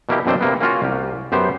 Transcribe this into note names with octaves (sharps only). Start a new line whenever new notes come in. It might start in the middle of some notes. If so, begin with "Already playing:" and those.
B2 A#3 E4 G4
F#2 B2 C4 D4 C5
C3 A#3 B3
A#3 C#4 F4 F#4
C2 G4
F#2 B3 G4 C5